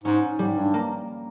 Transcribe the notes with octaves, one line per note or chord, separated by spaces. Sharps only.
G#2 C#4
G#2 G3
G2
A#3